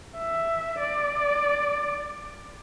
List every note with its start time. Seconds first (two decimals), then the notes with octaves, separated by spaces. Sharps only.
0.18 E5
0.81 D5